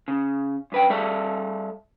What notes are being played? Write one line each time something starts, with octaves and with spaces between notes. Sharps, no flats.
C#3
F#2 B4 G5
G3 A4 E5 F5 A5